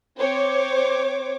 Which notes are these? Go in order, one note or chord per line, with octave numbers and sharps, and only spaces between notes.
C4 C5 C#5 D6